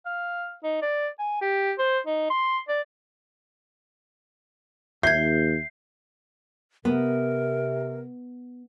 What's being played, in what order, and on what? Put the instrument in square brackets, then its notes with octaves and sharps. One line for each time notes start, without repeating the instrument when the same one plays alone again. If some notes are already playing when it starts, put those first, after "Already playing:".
[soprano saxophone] F5
D#4
D5
G#5
G4
C5
D#4
C6
D5
[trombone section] D#2 [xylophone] E5 G#6 [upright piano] G6 [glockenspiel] C7
[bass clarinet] C3 [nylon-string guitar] B3 [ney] A#4